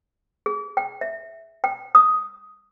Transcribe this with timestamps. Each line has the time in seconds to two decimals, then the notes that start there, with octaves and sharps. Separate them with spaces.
0.46 G#4
0.77 G5
1.01 E5
1.64 G5
1.95 D#6